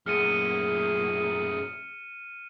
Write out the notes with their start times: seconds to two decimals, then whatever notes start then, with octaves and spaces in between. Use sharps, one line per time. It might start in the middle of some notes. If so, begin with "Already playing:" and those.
0.06 F#2 A#2 A3 G#4 F6 C#7 D#7